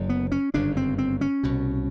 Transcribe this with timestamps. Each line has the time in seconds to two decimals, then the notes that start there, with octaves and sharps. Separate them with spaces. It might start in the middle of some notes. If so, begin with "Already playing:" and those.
Already playing: F#1 F#2 D3
0.09 B3
0.32 C#4
0.54 G1 F#2 C#3 D4
0.77 C4
0.98 C4
1.21 C#4
1.43 C2 B2